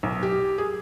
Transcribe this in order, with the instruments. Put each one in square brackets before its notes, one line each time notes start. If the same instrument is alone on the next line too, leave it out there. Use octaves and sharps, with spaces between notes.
[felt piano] B1
G4
G#4